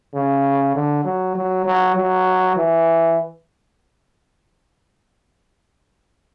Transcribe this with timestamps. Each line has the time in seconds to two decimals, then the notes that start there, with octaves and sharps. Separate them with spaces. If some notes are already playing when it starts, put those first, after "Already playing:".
0.14 C#3
0.75 D3
1.05 F#3
1.35 F#3
1.65 F#3
1.96 F#3
2.56 E3